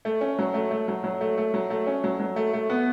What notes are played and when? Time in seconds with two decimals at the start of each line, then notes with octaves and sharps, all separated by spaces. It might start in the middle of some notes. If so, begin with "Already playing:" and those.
0.05 A3
0.21 C#4
0.39 F#3
0.54 A3
0.71 A3
0.88 F#3
1.04 F#3
1.21 A3
1.37 A3
1.54 F#3
1.70 A3
1.87 C#4
2.04 F#3
2.20 F#3
2.36 A3
2.53 A3
2.70 B3